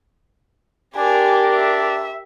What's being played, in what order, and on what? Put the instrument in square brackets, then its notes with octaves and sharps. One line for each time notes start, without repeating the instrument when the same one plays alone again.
[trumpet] D4 [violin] G4 A#4 [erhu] G#5
[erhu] E5